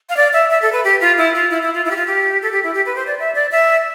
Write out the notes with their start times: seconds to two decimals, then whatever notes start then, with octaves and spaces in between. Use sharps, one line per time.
0.09 F5
0.17 D5
0.33 E5
0.50 E5
0.62 A4
0.73 B4
0.85 G4
1.01 F4
1.18 E4
1.35 F4
1.51 E4
1.62 E4
1.74 F4
1.85 E4
1.91 G4
1.96 F4
2.07 G4
2.42 A4
2.52 G4
2.63 E4
2.74 G4
2.86 B4
2.96 C5
3.07 D5
3.19 E5
3.35 D5
3.52 E5